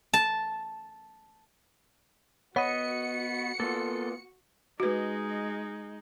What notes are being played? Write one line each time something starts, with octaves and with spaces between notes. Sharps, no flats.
A5
B3 F#4 C#5 D#5 F#5 B5 C#7
A#3 B3 F4 A4
G#3 D#4 F#4 B4